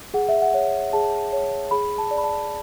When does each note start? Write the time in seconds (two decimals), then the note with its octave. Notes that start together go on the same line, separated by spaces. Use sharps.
0.14 G#4 F#5
0.29 E5
0.42 F#5
0.54 C#5
0.93 G#4 A5
1.33 C#5
1.71 G#4 B5
1.98 A5
2.11 D5
2.18 B5
2.24 A5